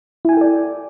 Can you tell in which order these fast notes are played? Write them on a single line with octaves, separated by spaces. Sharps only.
E4 G#5 G5 A4 D5